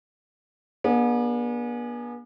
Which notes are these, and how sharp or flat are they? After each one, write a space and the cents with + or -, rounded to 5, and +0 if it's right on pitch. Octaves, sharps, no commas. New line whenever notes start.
B3 -45 D4 +0 G#4 +0